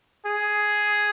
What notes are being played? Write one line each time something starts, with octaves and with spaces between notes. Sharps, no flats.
G#4